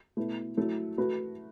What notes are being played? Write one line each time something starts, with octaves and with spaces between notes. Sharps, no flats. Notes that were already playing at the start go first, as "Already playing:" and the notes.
B2 A3 E4 B4
F#3 A3 E4 A4
A3 F#4 B4